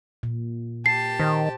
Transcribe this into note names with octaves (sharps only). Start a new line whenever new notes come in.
A#2
G4 A5 C7
D#3 C5